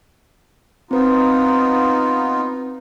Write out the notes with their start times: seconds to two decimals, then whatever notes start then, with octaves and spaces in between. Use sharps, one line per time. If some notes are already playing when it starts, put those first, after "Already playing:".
0.91 B3 C4 D#4 F4 B4